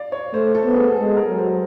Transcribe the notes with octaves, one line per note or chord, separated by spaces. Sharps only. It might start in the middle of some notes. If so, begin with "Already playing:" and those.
Already playing: D5 F5
C#5
A3 C5
A4
B3
G#4
G#4
G#3 A4
A#4
F#3
C5